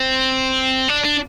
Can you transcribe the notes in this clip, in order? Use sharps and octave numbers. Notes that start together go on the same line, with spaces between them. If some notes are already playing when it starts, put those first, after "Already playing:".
Already playing: C4
D4
D4